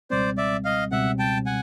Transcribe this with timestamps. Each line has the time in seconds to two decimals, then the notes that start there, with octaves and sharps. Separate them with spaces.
0.10 C#2 B2 G3 C4 C5 D5
0.37 D5 E5
0.65 D#5 F5
0.92 C#2 B2 G3 C4 E5 F#5
1.19 G5 A5
1.46 F#5 G#5